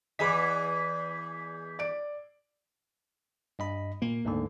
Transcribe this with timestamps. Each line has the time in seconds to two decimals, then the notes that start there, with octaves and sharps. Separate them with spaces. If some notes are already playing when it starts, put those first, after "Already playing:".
0.19 E2 E3 G#4 D#5 B5 D6 B6
1.79 D5 D7
3.59 G2 D#5 B5
4.02 A#2 A#3
4.25 D2 G#2 D3